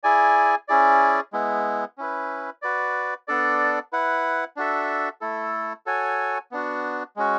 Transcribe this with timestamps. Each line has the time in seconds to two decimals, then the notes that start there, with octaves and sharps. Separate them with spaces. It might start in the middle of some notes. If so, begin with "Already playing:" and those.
0.03 E4 G#4 D5 G#5
0.68 C#4 E4 G#4 D5
1.33 G#3 B3 E4
1.98 C#4 E4 B4
2.62 F#4 B4 D5
3.28 B3 D4 A4 D5
3.93 E4 B4 F#5
4.56 D4 F#4 A4 E5
5.21 A3 E4 A4
5.86 F#4 A4 C#5 G#5
6.51 B3 D4 F#4
7.16 G#3 C#4 F#4